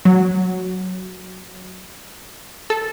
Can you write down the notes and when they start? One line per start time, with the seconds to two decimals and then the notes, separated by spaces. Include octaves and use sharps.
0.05 F#3
2.70 A4